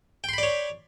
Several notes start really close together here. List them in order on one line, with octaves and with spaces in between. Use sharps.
G5 C6 B5 D5 C#5